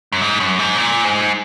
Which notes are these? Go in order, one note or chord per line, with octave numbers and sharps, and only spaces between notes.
F#2
G#2
F#2
G#2
A#2
G#2